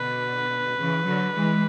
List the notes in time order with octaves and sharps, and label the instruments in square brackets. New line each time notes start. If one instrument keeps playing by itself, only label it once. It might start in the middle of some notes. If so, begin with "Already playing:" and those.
Already playing: [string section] B2 D3 [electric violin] B4
[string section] C#3 E3
D3 F#3
E3 G#3